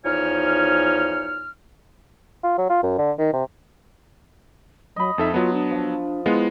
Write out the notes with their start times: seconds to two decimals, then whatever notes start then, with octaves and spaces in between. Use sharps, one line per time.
0.05 E2 F3 D#4 C#5 G#5 F6
2.43 F4
2.58 F#3
2.69 F4
2.83 F#2
2.98 D3
3.18 D#3
3.33 C3
4.96 F#3 D#5 B5
5.18 F2 D#4 A4 E5
5.34 F#3 B3 F4 A5
5.53 D4
5.70 F3
6.26 G#3 B3 E4 F4